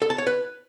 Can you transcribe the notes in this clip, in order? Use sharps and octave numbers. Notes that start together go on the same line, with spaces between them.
A4
A5
C#5
B4